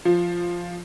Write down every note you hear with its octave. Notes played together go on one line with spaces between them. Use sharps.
F3